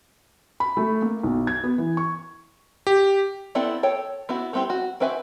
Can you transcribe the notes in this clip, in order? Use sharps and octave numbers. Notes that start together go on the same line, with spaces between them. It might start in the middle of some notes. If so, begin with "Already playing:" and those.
B5
A3
A#3
B1
G#6
B3
E3
C#6
G4
B3 C4 E4 A4 D5
A4 C#5 G5
B3 E4 F#4
G3 B3 C4 E4 G4
F#4
C4 F#4 B4 E5 G#5